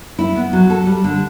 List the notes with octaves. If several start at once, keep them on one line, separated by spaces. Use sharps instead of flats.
E4
B3
F#3
A4
G3
D3